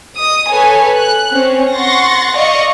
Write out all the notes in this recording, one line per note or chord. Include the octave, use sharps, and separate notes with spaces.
D#5 D#6
A4 B4 C#5 G#5
F#6
C4 C#4 C#5
F#5 C6 C#6 A6 A#6
D5 D#5 F5 C#6